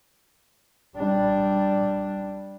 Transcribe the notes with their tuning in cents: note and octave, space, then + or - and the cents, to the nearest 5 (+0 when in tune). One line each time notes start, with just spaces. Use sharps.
G3 -5 D4 +0